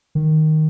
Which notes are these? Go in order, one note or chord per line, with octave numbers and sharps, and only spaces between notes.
D#3